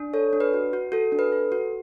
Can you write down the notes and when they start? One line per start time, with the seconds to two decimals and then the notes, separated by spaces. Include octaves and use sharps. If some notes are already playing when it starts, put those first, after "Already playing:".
Already playing: D4
0.14 A4 C#5
0.33 D4
0.40 B4
0.54 F#4
0.73 F#4
0.92 F#4 A4
1.12 D4
1.19 B4
1.32 A4
1.52 F#4